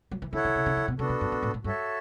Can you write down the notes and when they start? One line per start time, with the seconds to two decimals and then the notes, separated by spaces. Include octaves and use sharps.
0.11 F#3
0.22 E3
0.33 D3 E4 A4 C#5 F#5
0.45 D3
0.55 C#3
0.66 C#3
0.77 D3
0.88 B2
0.99 C#3 B3 D4 F#4 A4
1.09 B2
1.21 F#2
1.32 F#2
1.43 A2
1.54 A2
1.64 G2 F#4 A4 C#5 E5 A5